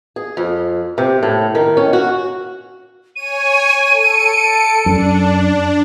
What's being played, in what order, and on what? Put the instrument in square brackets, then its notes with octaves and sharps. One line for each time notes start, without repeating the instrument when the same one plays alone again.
[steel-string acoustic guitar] G#4
F2
C3
A2
D#3
C#4
F#4
[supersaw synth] C#5 G#5 [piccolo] D#7
[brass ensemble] A4 [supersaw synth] C#7 D7
[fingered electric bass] F#2 [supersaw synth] D4